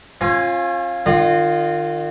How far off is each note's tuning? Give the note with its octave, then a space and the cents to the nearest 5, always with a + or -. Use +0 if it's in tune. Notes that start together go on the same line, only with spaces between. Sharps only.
C#4 -45 F4 +0 G#5 +0
D#3 -35 F4 +0 D#5 -30